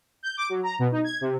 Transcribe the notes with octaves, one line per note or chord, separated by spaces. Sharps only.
G6
D6
F#3
A#5
B2
D#4
G#6
C3